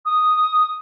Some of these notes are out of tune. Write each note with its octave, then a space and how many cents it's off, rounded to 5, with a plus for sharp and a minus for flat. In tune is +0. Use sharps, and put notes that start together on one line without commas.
D#6 -5